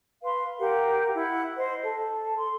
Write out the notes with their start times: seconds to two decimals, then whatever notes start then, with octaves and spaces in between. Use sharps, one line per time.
0.22 B4 F5 C6
0.60 G4 A#4 F5 F#5
1.14 E4 F#5
1.56 C5 D#5
1.83 A4
2.39 A4 C6